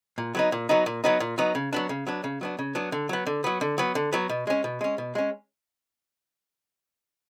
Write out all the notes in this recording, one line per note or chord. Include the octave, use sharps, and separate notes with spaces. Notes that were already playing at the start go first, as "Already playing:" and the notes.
A#2
F#3 B3 D#4
A#2
F#3 B3 D#4
A#2
F#3 B3 D#4
A#2
F#3 B3 D#4
C#3
F#3 B3 D4
C#3
F#3 B3 D4
C#3
F#3 B3 D4
C#3
F#3 B3 D4
D3
F#3 B3
D3
F#3 B3
D3
F#3 B3
D3
F#3 B3
B2
G#3 C#4
B2
G#3 C#4
B2
G#3 C#4